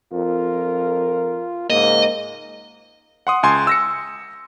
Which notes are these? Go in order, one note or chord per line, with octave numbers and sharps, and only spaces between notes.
F2 F4 A#4
G#2 C#3 A#3 D#5
F#5 C6 D#6
C#2 G#5 C6
E6 A#6 C#7